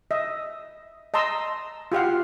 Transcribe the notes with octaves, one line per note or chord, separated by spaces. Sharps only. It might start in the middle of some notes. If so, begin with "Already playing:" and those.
D#5 E5
D#5 A5 A#5 C6 E6
F4 G4 F5 F#5